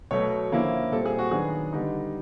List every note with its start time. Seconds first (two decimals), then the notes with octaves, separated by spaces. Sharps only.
0.11 B2 F#3 A3 C#5
0.52 D3 F3 A#3 C#4 E4
0.92 A#2 G3 C4 A4
1.06 G#4
1.19 F#4
1.31 D#3 F#3 B3 D4 G#4
1.73 D3 G3 B3 D#4